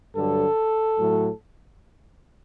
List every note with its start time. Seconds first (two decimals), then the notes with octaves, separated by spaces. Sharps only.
0.16 G2 D3 F#3 A4
0.99 A2 F#3